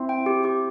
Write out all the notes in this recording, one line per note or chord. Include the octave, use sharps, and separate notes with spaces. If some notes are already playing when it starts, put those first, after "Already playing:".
Already playing: C4 E4
G5
G4
G4